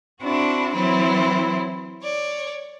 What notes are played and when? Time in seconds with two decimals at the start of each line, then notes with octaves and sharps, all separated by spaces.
0.22 C4 D4 E4 F#4
0.74 E3 F#3 C4 E4
2.02 C#5 D5